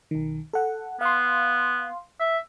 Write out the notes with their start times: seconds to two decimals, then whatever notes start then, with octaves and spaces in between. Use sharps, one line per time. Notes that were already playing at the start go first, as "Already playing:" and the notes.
0.11 B1 D#3
0.53 A4 F#5
1.01 B3 F5 C6
2.20 E5